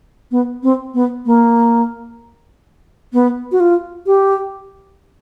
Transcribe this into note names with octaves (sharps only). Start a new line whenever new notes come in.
B3
C4
B3
A#3
B3
F#4
F4
G4